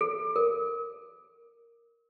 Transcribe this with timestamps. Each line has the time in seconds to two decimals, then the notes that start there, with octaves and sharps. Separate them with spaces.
0.01 A4
0.36 A#4